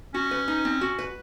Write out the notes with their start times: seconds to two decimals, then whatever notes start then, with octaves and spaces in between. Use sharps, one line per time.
0.14 C#4 F#4
0.31 B4
0.48 D#4
0.65 C4
0.81 F#4
0.99 B4